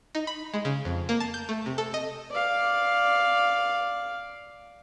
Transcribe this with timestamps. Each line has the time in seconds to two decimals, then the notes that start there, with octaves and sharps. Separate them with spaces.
0.15 D#4
0.27 B5
0.54 G#3
0.65 C#3
0.85 F2
1.09 A#3
1.20 A5
1.34 G6
1.49 A3
1.66 C3
1.78 A4
1.94 D#5
2.31 D5 F5